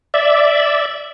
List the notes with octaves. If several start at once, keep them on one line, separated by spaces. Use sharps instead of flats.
D5 E5